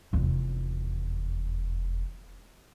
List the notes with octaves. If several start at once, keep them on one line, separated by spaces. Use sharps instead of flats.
F1 E2